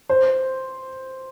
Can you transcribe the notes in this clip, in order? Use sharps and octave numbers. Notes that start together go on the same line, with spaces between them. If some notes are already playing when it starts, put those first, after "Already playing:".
C5